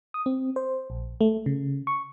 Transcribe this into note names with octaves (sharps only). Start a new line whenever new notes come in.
D#6
C4
C5
A#1
A3
C#3
C#6